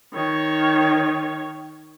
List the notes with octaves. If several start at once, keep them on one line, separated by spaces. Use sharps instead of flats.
D#3 C#5